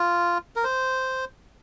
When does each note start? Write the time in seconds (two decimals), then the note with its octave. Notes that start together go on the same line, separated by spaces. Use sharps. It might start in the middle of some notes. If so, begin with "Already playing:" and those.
Already playing: F4
0.56 A#4
0.64 C5